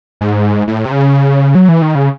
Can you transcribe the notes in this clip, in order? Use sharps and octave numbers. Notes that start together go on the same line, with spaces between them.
G#2
A2
C3
C#3
F#3
E3
D#3
C#3